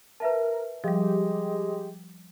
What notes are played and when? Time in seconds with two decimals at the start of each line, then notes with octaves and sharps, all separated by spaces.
0.20 A#4 B4 E5 A5
0.84 F3 G3 G#3 G4